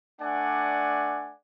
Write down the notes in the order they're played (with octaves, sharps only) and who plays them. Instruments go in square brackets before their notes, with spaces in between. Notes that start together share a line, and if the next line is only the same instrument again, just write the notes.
[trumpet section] A3 D4 D5 F#5 G#5